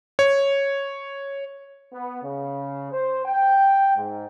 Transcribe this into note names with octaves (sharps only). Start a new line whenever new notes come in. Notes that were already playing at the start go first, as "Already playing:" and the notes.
C#5
B3
C#3
C5
G5
G#2